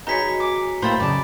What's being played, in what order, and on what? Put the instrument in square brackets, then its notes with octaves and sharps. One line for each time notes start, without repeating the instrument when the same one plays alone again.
[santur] F#3 G#3 B3 [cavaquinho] D#4 G#5 [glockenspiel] A#5 B6 C#7
[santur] G#5 [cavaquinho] D6
[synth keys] A2 A3 A#3 [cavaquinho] C5 E5 G5 [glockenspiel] B5 A6
[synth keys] F#2 C#3 [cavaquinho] D5 A5